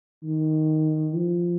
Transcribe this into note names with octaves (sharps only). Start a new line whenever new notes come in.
D#3
F3